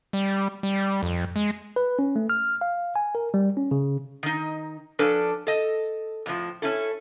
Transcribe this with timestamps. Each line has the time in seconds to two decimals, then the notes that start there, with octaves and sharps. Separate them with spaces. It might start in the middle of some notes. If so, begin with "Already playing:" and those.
0.13 G3
0.63 G3
1.03 F2
1.36 G#3
1.76 B4
1.99 C#4
2.16 A3
2.30 F6
2.61 F5
2.96 G#5
3.15 A#4
3.34 G3
3.57 C#4
3.71 C#3
4.23 D#3 D#4
4.99 F3 C#4 D4 A4 B4
5.47 A4 D#5
6.26 F2 A2 F3
6.62 C#4 E4 A4